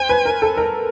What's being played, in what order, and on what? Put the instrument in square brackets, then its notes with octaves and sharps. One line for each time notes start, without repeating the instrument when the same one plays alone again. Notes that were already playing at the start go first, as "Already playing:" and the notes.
Already playing: [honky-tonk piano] C5 [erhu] G#5
[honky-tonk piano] B4
A#4
A4
A#4